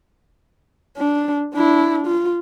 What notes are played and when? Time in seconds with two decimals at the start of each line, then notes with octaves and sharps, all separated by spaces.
0.98 D4
1.54 D4 E4
2.07 F4